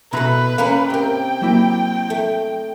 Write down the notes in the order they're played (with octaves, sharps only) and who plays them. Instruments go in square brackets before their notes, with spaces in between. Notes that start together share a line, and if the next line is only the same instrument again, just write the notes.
[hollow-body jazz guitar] B2 A#5 B5 [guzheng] E4 A4 [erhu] B4
[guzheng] A#3 C#4 A#4 [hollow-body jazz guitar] F5
[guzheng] C3 A#4 [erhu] G5
[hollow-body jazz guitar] F#3 A#3 E4
[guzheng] A3